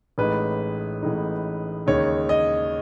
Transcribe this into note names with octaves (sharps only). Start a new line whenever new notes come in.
A1 A2 G#3 D#4 B4
A1 A2 G#3 D#4
D#2 C#3 G#3 D#4 C#5
D#5